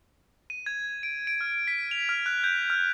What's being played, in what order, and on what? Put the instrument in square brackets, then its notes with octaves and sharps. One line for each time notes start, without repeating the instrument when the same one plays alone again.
[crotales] D#7
G#6
D7
D7
F6
B6
F7
F6
F#6
G6
F6